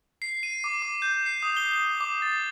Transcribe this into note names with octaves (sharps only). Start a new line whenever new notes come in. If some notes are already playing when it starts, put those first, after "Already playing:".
C7
D#7
D6
D6
G6
C7
D#6
G7
G7
D6
A6